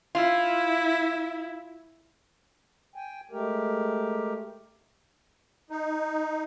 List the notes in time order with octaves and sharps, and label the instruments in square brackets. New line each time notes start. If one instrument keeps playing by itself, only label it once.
[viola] E4 [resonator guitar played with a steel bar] F4
[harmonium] G5 G#5
G#3 A3 G4 A#4
[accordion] D#4